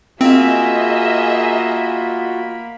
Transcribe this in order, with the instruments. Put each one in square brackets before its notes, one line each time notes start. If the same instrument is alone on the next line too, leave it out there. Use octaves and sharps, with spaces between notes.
[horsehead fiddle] A#3 B5 [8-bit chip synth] C4 [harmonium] F4 F#4 [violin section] G#4 D#5 E5